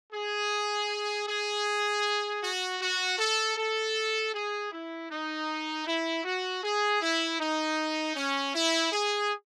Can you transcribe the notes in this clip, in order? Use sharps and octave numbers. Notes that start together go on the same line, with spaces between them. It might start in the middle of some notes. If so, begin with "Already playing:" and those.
G#4
G#4
F#4
F#4
A4
A4
G#4
E4
D#4
E4
F#4
G#4
E4
D#4
C#4
E4
G#4